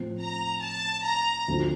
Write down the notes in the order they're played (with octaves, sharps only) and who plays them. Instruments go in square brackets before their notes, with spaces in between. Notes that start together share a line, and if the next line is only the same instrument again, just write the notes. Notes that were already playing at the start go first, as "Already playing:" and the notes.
Already playing: [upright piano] A2 F3 C4
[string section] A#5
A5
A#5
[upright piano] D2 D3 F3 C4